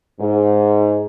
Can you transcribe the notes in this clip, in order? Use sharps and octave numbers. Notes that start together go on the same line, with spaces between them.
G#2